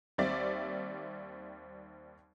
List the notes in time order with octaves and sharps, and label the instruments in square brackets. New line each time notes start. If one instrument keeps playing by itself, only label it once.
[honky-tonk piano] D#2 G3 C4 D5 E5